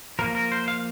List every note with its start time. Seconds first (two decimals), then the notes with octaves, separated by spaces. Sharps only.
0.19 F3 A#3 A#4
0.35 A#4
0.52 C5
0.68 F5